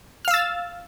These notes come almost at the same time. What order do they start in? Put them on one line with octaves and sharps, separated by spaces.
F6 F5 E6 A6